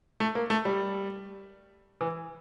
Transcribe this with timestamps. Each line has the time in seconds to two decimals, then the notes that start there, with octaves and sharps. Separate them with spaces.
0.20 A3
0.35 A#3
0.50 A3
0.65 G3
2.01 E3